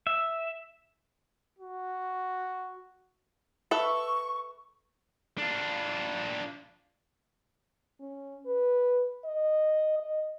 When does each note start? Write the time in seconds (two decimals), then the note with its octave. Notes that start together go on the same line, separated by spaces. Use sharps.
0.07 E5
1.58 F#4
3.71 A4 B4 E5 C#6
5.38 D4 F4
8.00 C#4
8.46 B4
9.25 D#5
10.00 D#5